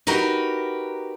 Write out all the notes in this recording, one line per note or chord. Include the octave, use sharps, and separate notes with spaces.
D#4 F#4 G4 A#4 B4